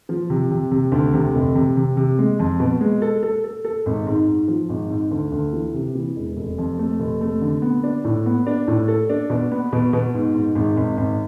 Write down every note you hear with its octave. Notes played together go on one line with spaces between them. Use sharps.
F3
C3
C3
C3
D2
C3
F1
C3
C3
C3
G#3
F2
B2
G#3
A4
A4
A4
A4
G#1
G#2
G#2
F3
G#1
G#2
D2
D2
E3
C3
E3
E1
F1
F2
A3
F1
A3
D3
B3
D4
A2
B3
D4
A2
A4
D4
B2
B3
B2
B2
G#2
G#2
G#1
G#1
G#1